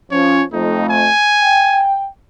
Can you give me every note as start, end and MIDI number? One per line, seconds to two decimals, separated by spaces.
0.11 0.42 53
0.11 0.42 61
0.11 0.44 73
0.53 1.08 41
0.53 1.08 57
0.53 0.89 63
0.89 1.84 80
1.42 2.05 79